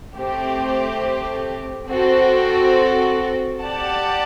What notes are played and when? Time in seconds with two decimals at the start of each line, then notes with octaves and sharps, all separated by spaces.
0.17 A3 C4 G4
1.89 C4 F#4 A4
3.61 G4 D5 F#5 A5